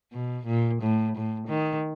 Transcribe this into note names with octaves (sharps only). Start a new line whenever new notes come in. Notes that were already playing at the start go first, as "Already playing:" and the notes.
B2
A#2
A2
A2
D#3